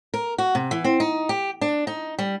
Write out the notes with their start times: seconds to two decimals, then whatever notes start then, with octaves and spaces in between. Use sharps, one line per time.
0.14 A#4
0.38 F#4
0.55 C3
0.71 E3
0.84 C4
1.00 D#4
1.29 G4
1.61 D4
1.87 D#4
2.18 G3